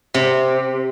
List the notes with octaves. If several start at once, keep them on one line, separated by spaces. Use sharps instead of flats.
C3